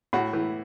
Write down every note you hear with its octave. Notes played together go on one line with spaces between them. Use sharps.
A2 F#4
E3